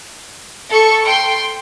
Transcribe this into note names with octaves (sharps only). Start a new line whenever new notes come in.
A4 C#6
G5 C6